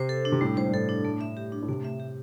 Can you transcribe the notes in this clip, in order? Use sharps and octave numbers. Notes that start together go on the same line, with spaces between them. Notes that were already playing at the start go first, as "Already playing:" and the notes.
Already playing: C3 C5
A4
D4
C3
A2 G3
A2 C5
G2
A2 A4
D4
A3
E5
G4
D4
A2
C3 A3
E5
G4